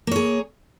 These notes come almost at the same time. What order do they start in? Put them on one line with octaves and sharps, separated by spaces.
A#3 C#5 G#4